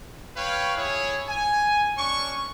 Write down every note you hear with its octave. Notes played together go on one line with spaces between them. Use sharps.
B4 C#5 F5 G5
E4 G#4 C#5
G#5
C#4 D4 C#6